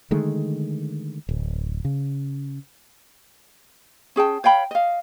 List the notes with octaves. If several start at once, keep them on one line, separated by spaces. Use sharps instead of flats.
D3 D#3 G#3 A3
D1
C#3
C#4 G#4 G5 A5
C#5 F5 G5 B5
D#5 F5